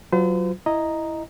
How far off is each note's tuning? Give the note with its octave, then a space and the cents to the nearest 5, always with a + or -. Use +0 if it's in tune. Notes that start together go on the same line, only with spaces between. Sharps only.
F#3 +5 F4 +5 C5 -45
E4 +0 D#5 +0 A#5 +0